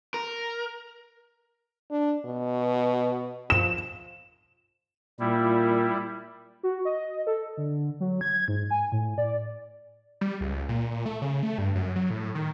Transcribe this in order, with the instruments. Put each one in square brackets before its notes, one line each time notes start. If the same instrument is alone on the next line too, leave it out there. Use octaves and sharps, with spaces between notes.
[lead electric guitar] A#4
[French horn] D4
B2
[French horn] F3 [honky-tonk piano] E7
[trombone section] A#2 [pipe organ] G3 E4
[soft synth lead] F#4
D#5
A4
D3
F#3
G#6
G#2
G#5
A2
D5
[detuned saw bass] G3
C#2
A#2
A#2
A3
C#3
A3
G2
F#2
F#3
A2
D#3